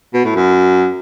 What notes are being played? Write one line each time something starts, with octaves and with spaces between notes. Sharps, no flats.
B2
A2
F#2